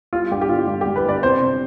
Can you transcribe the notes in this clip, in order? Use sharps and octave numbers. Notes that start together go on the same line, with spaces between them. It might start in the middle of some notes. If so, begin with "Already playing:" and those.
G3 F4
G2 G4
G4
D3 F4
G2
G4
G2
B4
G1 D5
C3 C5
C3